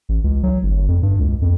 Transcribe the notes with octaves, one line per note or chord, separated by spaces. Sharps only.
A1
C#2
F#3
G1
F2
G2
C#2
F2